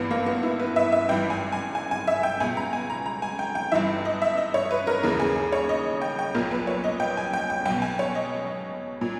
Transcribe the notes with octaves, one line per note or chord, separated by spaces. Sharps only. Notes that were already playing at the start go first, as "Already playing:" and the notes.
Already playing: G#1 G2 E3 B3
A#3
B3
E4
B4
E5
E5
G#1 G2 E3 G5
G#5
G#5
G#5
G#5
E5
G5
C#2 B2 G#5
A#5
G#5
A#5
A#5
G#5
G5
G5
G1 G2 E3 E5
D#5
E5
D#5
C#5
B4
A#4
D#2 C#3 E3 A#4
G#4
G#4
C#5
D#5
G5
G5
B1 A#2 A#4
B4
C#5
D#5
G5
G#5
G5
G5
B1 B2 G5
G#5
C#5
D#5
A#2